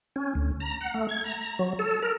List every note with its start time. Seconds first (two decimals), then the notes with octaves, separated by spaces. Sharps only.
0.16 C#4
0.35 D2
0.60 A#5
0.81 F#5
0.94 A3
1.09 G#6
1.24 A#5
1.59 F#3
1.79 A4
2.03 A#4